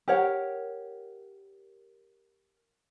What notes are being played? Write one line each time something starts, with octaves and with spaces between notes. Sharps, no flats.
G4 A#4 C#5 F#5